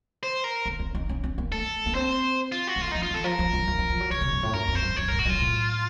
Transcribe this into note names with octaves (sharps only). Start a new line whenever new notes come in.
C5
A#4
A#3
C#4
D#4
C#4
C#4
A#3
A3 A4
A#3
C4 C5
F4
F#4
A#3
A3 F4
F3 D#4
F4
D#3 A4
F3 A#4
F3
F#2
F3
F3
F3
F#3
C#3 C#5
C#3
F#2
A2
F#2 A#4
F2
C5
F#2
F#2 C#5
A2 A#4
F#4
F#2 F4
A2